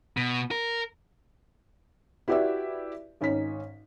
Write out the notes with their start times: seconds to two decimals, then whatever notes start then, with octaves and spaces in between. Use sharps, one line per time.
0.17 B2
0.51 A#4
2.28 E4 F#4 G4 B4 D5 E5
3.21 G#1 C#4 D#4 B6